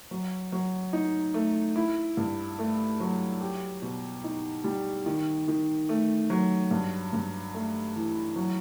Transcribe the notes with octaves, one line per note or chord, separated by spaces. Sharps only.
F#3
F#3
D#4
A3
E4
G2
A3
F#3
G4
B2
D#4
G3
D#3
D#3
A3
F#3
G2
G2
A3
E3
F#3